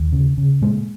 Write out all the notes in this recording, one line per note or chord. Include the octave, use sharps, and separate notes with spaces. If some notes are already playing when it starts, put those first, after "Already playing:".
Already playing: D#2
C#3
C#3
A#2 G#3